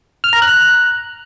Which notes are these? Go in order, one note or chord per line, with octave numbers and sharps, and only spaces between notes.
F6
A#5
F#6